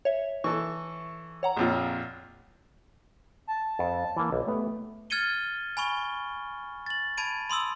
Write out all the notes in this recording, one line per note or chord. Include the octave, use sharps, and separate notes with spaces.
C#5 E5
E3 A4 C#6
C#5 F#5 A#5
A#1 F2 F4
A5
F2
E3 A#3
B1
A3 B3 G4
F6 G#6 A6 C#7 D#7 G7
G#5 B5 C#6 G7
A6 F#7
A5 B5 G#6 D7 D#7
B5 C6 D#6 E6